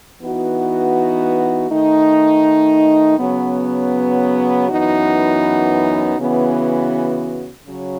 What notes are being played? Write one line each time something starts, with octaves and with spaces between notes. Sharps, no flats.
E3 B3 D#4 F#4
D#3 A3 D#4
C#3 F#3 B3
F#2 E3 B3 D#4 F#4
C#3 E3 B3 F#4
C#3 F#3